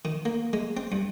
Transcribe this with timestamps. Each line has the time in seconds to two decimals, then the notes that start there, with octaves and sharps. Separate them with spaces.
0.05 D#3
0.25 A#3
0.53 G#3
0.77 C4
0.92 G2